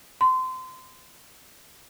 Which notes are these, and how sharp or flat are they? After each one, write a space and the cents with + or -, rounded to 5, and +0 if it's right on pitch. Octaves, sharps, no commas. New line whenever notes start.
C6 -25